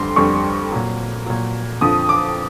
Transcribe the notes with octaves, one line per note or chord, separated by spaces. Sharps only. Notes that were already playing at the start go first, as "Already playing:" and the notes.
Already playing: F2 D3 G3 C6
F2 D3 G3 C#6
A#2 F#3
A#2 F#3
F2 D3 F3 D#6
D6